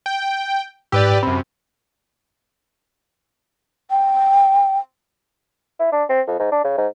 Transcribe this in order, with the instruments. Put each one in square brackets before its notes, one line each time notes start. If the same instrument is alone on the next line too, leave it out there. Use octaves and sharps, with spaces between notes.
[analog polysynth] G5
[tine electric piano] G#2 E6 [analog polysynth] G4 B4 D5
[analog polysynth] F#2 C3 [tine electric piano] B5
[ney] G5
[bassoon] E4
D4
C4
F2
G#2
D4
C#3
G#2